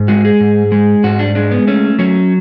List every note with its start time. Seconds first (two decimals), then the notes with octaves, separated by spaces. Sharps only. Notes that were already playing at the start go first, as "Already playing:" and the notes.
Already playing: G#2
0.08 G#3 F#4
0.25 G#4
0.40 G#2
0.72 G#3
1.04 G#2 F#4
1.19 D4
1.35 G#3 D4
1.52 B3
1.67 A3 C#4
1.99 F#3 C#4